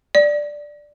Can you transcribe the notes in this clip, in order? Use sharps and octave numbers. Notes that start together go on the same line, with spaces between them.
D5